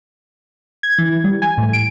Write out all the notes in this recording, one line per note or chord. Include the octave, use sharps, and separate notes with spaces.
G#6
E3
G3
G#5
A2
D7